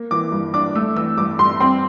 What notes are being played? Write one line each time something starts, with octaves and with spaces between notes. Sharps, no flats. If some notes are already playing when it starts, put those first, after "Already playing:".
Already playing: A#3
E3 D6
G2
D4 D6
A3 E6
E3 E6
G2 D6
G2 C6
C4 C6